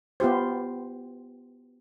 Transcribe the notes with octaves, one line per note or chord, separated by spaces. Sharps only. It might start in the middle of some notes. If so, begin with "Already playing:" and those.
B3 F4 G4 C5